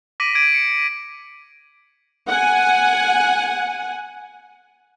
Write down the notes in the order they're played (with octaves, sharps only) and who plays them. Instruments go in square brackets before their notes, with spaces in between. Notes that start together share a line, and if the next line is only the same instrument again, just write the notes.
[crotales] D6 A#6 B6 D7 D#7 F#7
G#6 D7 D#7
C#7
[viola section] F#5 G#5